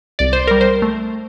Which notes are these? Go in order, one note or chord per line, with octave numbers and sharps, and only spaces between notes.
C2 D5
C5
G3 A#4
C5
A3